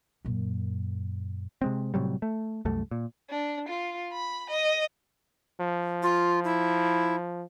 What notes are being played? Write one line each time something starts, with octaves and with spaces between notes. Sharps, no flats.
F#2 A#2
C3 G#3 C4
A2 C3 F#3 G3
A3
C2 F#2 A3
A#2
D4
F4
B5
D#5
F3
F4
E4